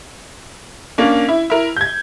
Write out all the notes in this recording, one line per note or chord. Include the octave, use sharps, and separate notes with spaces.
A#3 C#4 D4
E4
E4 A#4
G6 G#6